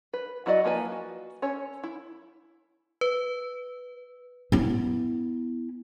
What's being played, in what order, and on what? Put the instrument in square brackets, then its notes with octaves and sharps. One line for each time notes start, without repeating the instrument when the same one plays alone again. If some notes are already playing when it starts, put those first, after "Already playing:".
[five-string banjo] B4
F#3 E4 F#4 D5 D#5
F3 A#3 B4 G#5
F#4
C#4 A4 C#5
E4
[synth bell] B4
[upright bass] B3 E4